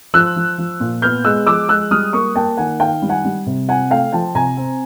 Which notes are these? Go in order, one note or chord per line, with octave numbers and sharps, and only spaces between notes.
F3 E6 F#6
F3
F3
A#2
B3 F6 G6
G#3 E6 F#6
F3 D6 E6
G#3 E6 F#6
G3 D#6 F6
A#3 C#6 D#6
A#3 G5 A5
D#3 F#5 G#5
D#3 F5 G5
G3
F#5 G#5
G3
C3
C4 F#5 G#5
A3 F5 G5
F3 G5 A5
C3 G#5 A#5
C4